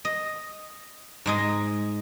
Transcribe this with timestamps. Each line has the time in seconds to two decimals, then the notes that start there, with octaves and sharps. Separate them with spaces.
0.05 D#5
1.26 G#2 G#3 D#5